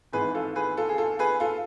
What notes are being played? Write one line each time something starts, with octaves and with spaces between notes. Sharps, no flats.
G#1 G#2 E3 G#4 B4
F4 A4
G#4 B4
F4 A4
G#4
F4 A4
G#4 B4
F4 A4